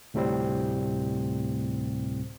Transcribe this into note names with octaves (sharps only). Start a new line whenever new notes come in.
D2 A2 C3 G3 C4